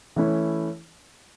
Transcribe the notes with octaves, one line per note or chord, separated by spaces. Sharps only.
E3 A3 C#4 E4